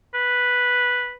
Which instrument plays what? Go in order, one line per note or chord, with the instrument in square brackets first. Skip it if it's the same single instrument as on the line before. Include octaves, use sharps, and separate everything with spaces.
[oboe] B4